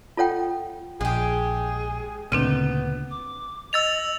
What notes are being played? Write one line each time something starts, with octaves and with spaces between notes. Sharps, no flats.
F4 A4 C#5 F#5 G5
A#1 G#3 G4 G#4
D2 A#2 C#3 B3 C4 D4 D#4
D6
D#5 E6 A6 F7